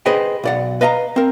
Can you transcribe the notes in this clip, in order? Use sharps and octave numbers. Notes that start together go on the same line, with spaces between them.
G#4 B4 C5 D#5 G5
B1 D5 F#5
B4 D#5 F5 A5 A#5
C4 A#4